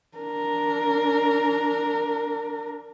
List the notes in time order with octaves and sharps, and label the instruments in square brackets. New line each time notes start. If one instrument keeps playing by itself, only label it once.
[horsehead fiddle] D4 A#4